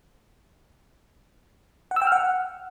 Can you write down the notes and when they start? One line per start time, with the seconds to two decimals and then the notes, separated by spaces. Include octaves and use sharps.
1.91 F#5
1.96 E6
2.02 G5
2.07 F6
2.12 F#5